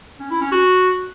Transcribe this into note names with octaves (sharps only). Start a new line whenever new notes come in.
C#4
E4
C#4
F#4